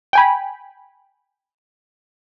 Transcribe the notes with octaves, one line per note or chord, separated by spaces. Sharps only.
G5 G#5 B5